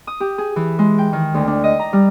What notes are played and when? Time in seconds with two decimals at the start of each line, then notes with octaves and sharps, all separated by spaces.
0.07 D#6
0.20 G4
0.38 G#4
0.56 E3
0.79 G#3
0.98 G5
1.13 D#3
1.34 D2
1.47 D4
1.64 D#5
1.79 A#5
1.93 G3